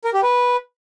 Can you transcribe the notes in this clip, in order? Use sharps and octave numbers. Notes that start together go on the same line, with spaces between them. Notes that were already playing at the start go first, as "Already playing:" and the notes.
A#4
G4
B4